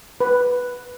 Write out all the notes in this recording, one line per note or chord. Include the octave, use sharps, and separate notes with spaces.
B4